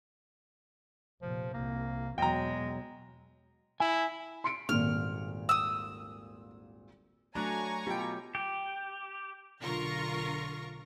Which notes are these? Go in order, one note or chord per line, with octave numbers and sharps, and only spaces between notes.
F1 A#2 F3
C2 F2 A#3
E2 B2 F#3 G#3 G5 A#5
E4 G#5
C6 C#7 D7
D#1 G#1 A#2 F6
D#6 E6
F#3 A3 D4 G#5 A#5 C#6 F#6
B2 F#3 F4 G4 G5
G4
B1 D3 F4 A#4 C#6 A#6